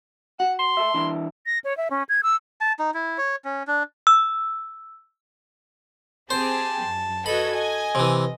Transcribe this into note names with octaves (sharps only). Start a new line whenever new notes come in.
F#4 F#5
C6
A4 E5
E3 D4 E4
A#6
C#5
E5
C#4
G#6
E6
A5
D#4
E4
C#5
C#4
D4
E6
C4 G4 G#4 C5 A5
F#2
F#4 A4 B4 D#5 B5 G#6
D#5 G#5
C3 E3